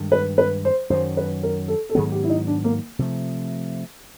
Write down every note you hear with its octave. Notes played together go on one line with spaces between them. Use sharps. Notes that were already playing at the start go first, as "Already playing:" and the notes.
Already playing: G2 D#3 G#3
B4
B4
C5
F#2 D#3 F#3 C5
B4
A#4
A4
A4
G#2 D#3 F#3 B3 G#4
G4
E4
D#4
D4
A#3
C3 F3 A3